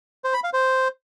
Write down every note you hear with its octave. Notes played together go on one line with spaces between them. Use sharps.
C5
B5
F5
C5